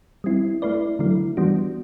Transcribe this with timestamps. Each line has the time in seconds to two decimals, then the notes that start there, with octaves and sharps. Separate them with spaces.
0.24 G3 C4 E4
0.62 A3 E4 B4 D5
0.99 D3 F#3 A3 E4
1.37 E3 G3 B3 D4 F#4